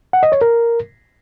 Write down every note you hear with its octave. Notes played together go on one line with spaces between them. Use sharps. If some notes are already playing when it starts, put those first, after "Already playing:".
F#5
D#5
C#5
A#4